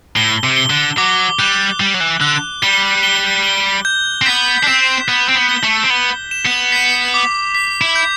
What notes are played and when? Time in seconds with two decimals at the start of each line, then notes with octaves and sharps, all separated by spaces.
0.16 A2 G7
0.44 C3
0.56 G7
0.70 D3
0.98 F#3 D6
1.39 G3 F#6
1.80 G3 D6
1.94 F#3
2.00 E3
2.20 D3 F#6
2.62 G3 G7
3.03 G7
3.44 G7
3.85 G6
4.22 C4
4.26 B3 B6
4.63 D4
4.67 C4 E7
5.08 B3 B6
5.29 C4
5.35 B3
5.49 G7
5.63 A3
5.83 C4
5.90 B3 G7
6.31 E7
6.45 B3
6.72 B6
7.14 D6
7.55 B6
7.81 E4
7.95 G6